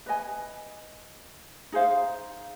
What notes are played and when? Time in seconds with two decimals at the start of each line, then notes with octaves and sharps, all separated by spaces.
0.06 B4 D#5 G#5
1.72 D#4 G#4 C5 F5